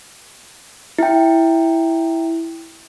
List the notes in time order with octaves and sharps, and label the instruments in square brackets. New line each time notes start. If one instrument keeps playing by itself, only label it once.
[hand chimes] E4 G5